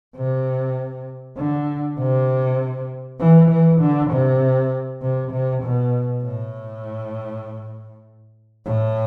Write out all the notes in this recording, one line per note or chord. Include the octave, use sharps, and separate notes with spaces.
C3
D3
C3
E3
E3
D3
C3
C3
C3
B2
A2
A2